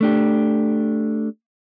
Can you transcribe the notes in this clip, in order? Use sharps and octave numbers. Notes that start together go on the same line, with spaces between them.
A3 D4 G4